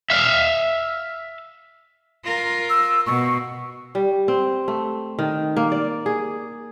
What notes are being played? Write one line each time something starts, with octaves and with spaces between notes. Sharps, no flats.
E5 F5
F4 A#4
E6
B2 C#6
G3
C4
A3
D#3
A#3
D5
G#4